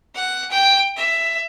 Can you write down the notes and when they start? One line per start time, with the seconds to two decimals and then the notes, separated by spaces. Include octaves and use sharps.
0.15 F#5
0.51 G5
0.96 E5